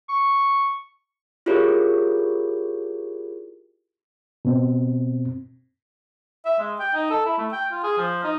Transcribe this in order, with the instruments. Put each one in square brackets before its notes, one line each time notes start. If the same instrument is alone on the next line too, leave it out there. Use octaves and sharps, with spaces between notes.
[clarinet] C#6
[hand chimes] E4 F4 G4 G#4 A#4 C#5
[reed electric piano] B2 C4
[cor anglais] E5
G#3
G5
D#4
A4
E4
A3
G5
F4
G#4
F3
D#4